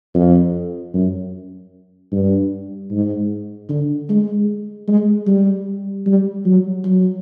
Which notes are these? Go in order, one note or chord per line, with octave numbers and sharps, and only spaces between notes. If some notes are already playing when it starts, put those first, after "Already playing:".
F2
F#2
G2
G#2
D3
G#3
G#3
G3
G3
F#3
F#3